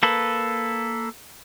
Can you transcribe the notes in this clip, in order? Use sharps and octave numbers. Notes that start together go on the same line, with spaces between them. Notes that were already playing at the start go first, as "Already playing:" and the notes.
A#3 A4 B4